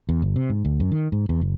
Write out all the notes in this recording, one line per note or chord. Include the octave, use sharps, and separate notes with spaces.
E2
G1
C3
G#2
D2
F#2
D#3
G#2
E2
F#1